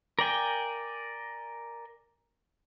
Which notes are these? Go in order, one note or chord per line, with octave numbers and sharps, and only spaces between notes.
A#4 D5 G5 G#5